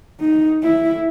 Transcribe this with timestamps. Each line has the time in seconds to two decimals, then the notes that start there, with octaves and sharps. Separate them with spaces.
0.20 D#4
0.63 E4